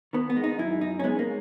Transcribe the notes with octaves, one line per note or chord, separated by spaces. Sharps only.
D#3 B3
B3
G#3
D#4
F#2 E4
F#2 D#4
C#4
G#3 B3
A#3